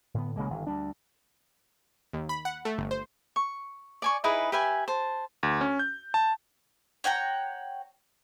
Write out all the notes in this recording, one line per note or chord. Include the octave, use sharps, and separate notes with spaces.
A2 D3 B3
B1 C#3 G#3 A#3
G1 D#3
D2 G3 D4
D#2
B5
F#5
A3
G1
C5
C#6
D5 G#5 C#6
D#4 E4 G#4 B4
G4 B4 E5 G#5
C5 A5
D2
C#4
G6
A5
C#5 F#5 G5 A#5